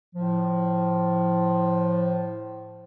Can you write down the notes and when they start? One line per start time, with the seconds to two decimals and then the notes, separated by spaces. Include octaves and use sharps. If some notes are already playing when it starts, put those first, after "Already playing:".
0.15 A2 F3